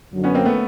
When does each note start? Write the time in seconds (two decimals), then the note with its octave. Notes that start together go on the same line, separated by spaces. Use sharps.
0.13 F#2 D3 F#3
0.24 B3 C#4
0.35 A#3 C4
0.45 A3 B3